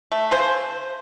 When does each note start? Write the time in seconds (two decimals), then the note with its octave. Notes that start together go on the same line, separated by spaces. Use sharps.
0.12 A3
0.31 C#3 C5